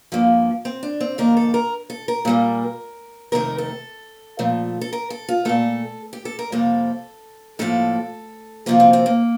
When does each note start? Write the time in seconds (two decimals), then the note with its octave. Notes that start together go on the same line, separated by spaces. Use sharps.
0.12 G2 F3 A#3
0.65 C4
0.83 D4
1.01 C4
1.18 F2 D#3 A#3 A#4
1.37 A4
1.54 A#4
1.90 A4
2.08 A#4
2.25 A#2 G3 A#3
3.32 F2 C3 D#3 A3 A#4
3.58 A4
4.39 A#2 F3 A3
4.81 A4
4.93 A#4
5.10 A4
5.29 F4
5.45 A#2 A3 A4
6.13 G4
6.25 A4
6.39 A#4
6.52 F2 C3 G3 A#3 A4
7.59 A2 F3 A#3 A4
8.66 D2 C3 F3 A#3 F4
8.80 C4
8.93 C4
9.06 A#3